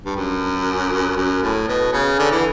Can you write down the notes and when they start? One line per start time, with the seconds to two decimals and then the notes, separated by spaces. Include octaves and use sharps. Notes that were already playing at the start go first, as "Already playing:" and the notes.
0.06 G2
0.16 F#2
1.17 F#2
1.43 A2
1.68 B2
1.93 C#3
2.19 D3
2.32 E3